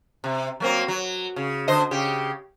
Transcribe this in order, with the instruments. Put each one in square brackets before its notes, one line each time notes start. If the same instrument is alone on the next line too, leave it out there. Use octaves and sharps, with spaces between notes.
[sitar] C3
F#3 A#3 C4
F#3
C#3
D3 C5 D#5
C#3 G4